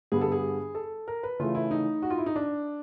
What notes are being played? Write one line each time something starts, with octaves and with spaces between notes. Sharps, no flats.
G2 D3 G3 B3 G#4
A4
G#4
A4
A#4
B4
C#3 E3 A3 F4
E4
D#4
F#4
F4
E4
D#4
D4